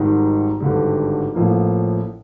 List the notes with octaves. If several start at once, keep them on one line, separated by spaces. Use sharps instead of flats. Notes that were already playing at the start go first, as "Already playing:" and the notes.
Already playing: G#1 G#2 D#3 G3
G#1 G2 D3 G3
A1 A2 F3 A#3